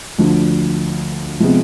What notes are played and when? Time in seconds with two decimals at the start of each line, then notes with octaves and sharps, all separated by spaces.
0.18 D2 D3 F3
1.40 C3 F3 G#3 B3